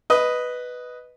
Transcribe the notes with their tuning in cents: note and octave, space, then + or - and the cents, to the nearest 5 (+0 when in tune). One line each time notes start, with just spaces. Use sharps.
B4 +0 D#5 +0